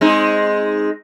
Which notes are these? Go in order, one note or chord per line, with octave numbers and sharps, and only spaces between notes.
G#3 C4 D#4